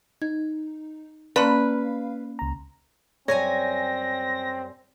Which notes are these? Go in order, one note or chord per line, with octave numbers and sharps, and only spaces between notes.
D#4 G#6
A#3 C#4 B4 D5 F5 A5 B5 C6
C#2 A#5
F#2 G3 C4 C#5 G#5 A#6